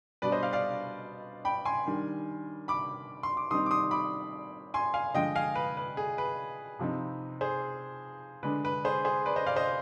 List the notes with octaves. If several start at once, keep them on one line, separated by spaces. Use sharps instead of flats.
B2 G3 D4 B4 D5
C5 D#5
D5 F5
D5 F5
G5 B5
G#5 C6
D#3 G3 D4
B5 D6
C6
D6
D#3 G3 C4 D#4 C6 D#6
D6
C6 D#6
B5 D6
G#5 C6
F5 G#5
D3 F3 G#3 D#5 G5
F5 G#5
B4
B4
G#4
B4
C3 F3 C4 D#4
G#4 C5
D3 G#3 D4 B4
B4
G#4 C5
G#4 C5
B4 D5
C5 D#5
D5 F5
C5 D#5